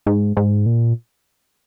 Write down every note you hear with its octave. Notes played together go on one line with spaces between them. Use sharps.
G#2
G#2
A#2